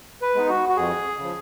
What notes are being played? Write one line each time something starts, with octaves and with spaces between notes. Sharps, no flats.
B4
G#3 B3 D#4
F#4
F#4
F2 G#4
C#3
F3